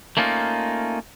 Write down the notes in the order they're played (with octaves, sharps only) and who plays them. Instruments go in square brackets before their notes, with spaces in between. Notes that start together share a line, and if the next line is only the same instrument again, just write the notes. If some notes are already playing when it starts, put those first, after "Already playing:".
[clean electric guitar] A3 A#3 C#4 D#4 F4